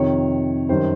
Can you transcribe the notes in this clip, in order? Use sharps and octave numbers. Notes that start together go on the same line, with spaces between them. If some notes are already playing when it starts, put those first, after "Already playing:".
Already playing: F2 C3 D#3 C#5
F#2 D#3 G3 C5